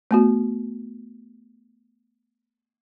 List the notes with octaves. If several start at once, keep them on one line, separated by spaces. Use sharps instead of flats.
A3 B3 F#4